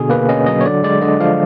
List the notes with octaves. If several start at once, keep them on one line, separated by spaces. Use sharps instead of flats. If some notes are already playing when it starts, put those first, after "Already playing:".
Already playing: B2 D3 G#4
A#3 B4
C#4 D#5
F#3 D#5
C#5
D3 D5
G#3 D5
D3 D#5
F3 F5